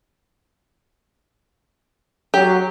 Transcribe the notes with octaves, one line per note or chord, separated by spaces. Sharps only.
F#3 G4